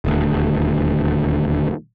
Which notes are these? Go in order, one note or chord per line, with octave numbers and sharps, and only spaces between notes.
D#1 D2